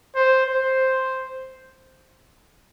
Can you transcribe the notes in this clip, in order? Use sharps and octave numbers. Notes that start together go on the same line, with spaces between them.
C5
C5